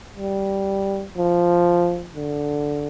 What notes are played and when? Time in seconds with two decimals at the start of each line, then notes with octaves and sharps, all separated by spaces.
0.17 G3
1.17 F3
2.16 D3